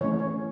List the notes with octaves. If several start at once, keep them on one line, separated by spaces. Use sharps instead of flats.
E3 A3 C#4 C#5
C#5